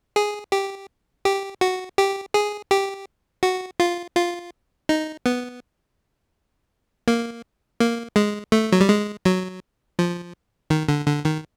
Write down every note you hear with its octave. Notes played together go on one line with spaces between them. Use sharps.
G#4
G4
G4
F#4
G4
G#4
G4
F#4
F4
F4
D#4
B3
A#3
A#3
G#3
A3
F#3
G3
G#3
F#3
F3
D#3
D3
D3
D#3